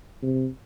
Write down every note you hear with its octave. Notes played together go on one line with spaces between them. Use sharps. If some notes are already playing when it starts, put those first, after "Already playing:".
C3